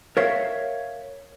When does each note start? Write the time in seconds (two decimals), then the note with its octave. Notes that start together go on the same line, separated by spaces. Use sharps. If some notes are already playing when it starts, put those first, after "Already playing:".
0.17 A#4 C#5 E5 F5